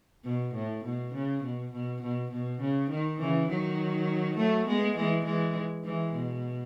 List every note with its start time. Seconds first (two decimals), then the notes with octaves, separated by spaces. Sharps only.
0.24 B2
0.54 A2
0.85 B2
1.14 C#3
1.43 B2
1.72 B2
2.02 B2
2.31 B2
2.61 C#3
2.90 D#3
3.20 C#3 E3
3.48 D#3 F#3
4.37 F#3 A3
4.66 G#3 B3
4.96 E3 G#3
5.25 E3 G#3
5.84 E3 G#3
6.14 B2